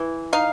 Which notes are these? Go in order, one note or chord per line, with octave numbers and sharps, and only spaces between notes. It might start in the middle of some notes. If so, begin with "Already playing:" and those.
Already playing: E3
D#4 F5